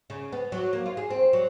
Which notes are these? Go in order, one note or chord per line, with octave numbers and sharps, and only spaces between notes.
C#3
B3
F#3
A#3
F4
G#4
C4
F#3